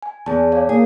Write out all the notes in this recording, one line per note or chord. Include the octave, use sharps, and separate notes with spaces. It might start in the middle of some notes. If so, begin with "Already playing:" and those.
G#5
E2 G#4 A5
C#5 D5 F5
A#3 G#4